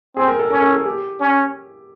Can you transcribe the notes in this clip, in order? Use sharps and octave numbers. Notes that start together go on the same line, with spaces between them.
C4 G#4
A#4
A4
C#4 A#4
A4
G#4
G4
C#4